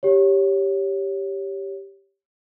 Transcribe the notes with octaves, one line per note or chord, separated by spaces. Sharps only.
G4 C#5